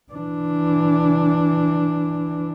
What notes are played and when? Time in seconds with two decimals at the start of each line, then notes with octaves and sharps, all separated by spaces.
0.13 E3 D4